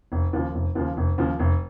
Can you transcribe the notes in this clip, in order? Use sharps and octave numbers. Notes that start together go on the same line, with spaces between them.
F1
D#2 C#3 F3
F1
D#2 C#3 F3
F1
D#2 C#3 F3
F1